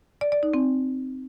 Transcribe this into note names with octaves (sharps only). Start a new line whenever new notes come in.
D5
D5
D#4
C4